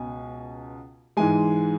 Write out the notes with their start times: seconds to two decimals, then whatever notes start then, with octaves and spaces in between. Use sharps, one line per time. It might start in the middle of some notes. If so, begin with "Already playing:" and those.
Already playing: C#2 B2 G#5
1.17 G#2 E3 G#3 G#5